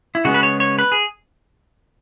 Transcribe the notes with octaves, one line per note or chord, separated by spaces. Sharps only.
E4
C#3 G#3 B3 F#4
B4
C#5
C#5
B4
G#4